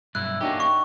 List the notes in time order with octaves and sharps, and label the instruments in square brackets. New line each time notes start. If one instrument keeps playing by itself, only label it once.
[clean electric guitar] B1 G2 E4 [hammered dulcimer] E5 [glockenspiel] F#6
[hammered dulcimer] D#3 D4 F#4 [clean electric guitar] A#3 C#4 G4
[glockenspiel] C#6